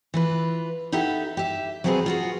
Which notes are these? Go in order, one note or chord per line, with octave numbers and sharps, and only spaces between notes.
E3 F4 B4
D#4 E4 G4 A4 E5 F#5
G4 E5
F#3 G3 C4 G4 G#4 B4
F4 F#4 G#4